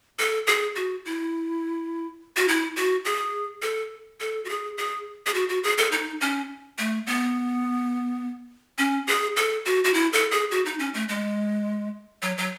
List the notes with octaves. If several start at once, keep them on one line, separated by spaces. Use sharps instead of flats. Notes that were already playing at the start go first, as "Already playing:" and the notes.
A4
G#4
F#4
E4
F#4
E4
F#4
G#4
A4
A4
F#4
G#4
G#4
G#4
F#4
F#4
G#4
A4
D#4
C#4
A3
B3
C#4
G#4
A4
F#4
F#4
E4
A4
G#4
F#4
D#4
C#4
A3
G#3
F#3
F#3